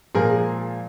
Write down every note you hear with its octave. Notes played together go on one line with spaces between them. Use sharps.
A#2 F3 G#3 G#4 A#4